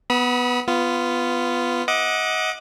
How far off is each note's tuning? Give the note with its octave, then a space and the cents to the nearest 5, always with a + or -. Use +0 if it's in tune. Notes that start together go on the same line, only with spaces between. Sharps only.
B3 +0 B5 -30 D#6 +40
B3 +10 F4 -10
D#5 +30 F#5 -10 D6 +25